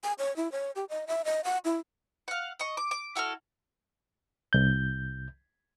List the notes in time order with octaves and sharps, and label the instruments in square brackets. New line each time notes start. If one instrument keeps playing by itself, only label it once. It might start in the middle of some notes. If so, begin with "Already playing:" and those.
[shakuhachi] G#5
C#5
E4
C#5
G4
D#5
E5
D#5
F#5
E4
[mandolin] F5 F#5
D#5 C#6
D6
D6
E4 F#4 A4 F6
[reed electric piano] C2 G6